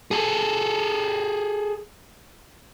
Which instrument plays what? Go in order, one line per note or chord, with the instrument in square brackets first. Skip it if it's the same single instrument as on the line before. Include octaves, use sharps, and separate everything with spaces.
[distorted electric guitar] G#4 A4